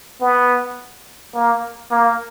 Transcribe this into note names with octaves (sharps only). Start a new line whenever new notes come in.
B3
A#3
A#3